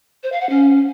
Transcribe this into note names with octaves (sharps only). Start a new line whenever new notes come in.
C5
F5
F#5
C#4